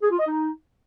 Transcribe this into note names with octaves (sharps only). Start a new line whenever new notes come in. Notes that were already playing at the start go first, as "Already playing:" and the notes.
G#4
F4
D#5
D#4